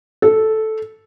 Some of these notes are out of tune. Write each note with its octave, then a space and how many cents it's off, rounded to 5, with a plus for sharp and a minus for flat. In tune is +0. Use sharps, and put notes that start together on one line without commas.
A4 -5